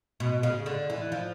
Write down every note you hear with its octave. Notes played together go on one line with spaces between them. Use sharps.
B2
C#3
D3
E3
F3